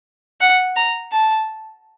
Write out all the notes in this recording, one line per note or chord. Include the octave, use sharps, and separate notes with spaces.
F#5
A#5
A5